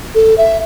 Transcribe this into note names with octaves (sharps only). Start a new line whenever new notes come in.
A4
E5